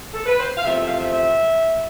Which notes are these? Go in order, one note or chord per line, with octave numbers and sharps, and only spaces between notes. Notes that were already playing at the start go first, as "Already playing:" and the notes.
A4
B4
C5
F5
E2 C3 F3 A3 C4 E5
E5
F5
E5
E5